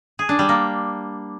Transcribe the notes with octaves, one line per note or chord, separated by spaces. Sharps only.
G#4
D4
G3
A#3